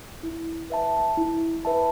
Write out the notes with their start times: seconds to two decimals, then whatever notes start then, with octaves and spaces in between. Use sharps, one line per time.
0.23 E4
0.70 B4 E5 A5
1.17 E4
1.65 B4 E5 A5